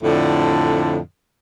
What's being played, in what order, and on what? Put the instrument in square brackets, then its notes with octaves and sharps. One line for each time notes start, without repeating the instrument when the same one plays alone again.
[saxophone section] F2 A2 D3